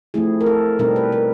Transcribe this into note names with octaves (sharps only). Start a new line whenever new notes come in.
F3 A3 C4 E4 G#4
A#4
A4
B2 G3 C4 D#4 A#4
B4
A#4